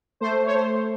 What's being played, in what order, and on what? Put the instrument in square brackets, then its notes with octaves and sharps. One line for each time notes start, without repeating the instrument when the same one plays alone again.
[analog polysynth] A3 C5
C#5
A3 C5